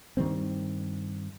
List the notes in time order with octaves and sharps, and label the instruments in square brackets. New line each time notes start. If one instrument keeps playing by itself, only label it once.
[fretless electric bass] G2 D#3 G3 C4